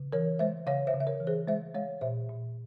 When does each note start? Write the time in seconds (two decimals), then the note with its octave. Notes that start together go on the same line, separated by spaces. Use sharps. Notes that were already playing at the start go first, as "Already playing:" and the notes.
Already playing: C#3
0.13 E3 A#4 C#5
0.39 G#3 C5 E5
0.66 C#3 C#5 F5
0.87 C5 E5
0.94 C#3
1.00 E5
1.07 A#4 C#5
1.20 E3
1.27 G#4 C5
1.47 G#3 C5 E5
1.74 G#3 C#5 F5
2.01 A#2 C5 E5
2.29 A#2